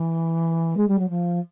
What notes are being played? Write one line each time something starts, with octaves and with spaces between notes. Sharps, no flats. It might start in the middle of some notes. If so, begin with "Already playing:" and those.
Already playing: E3
G#3
G3
F#3
F3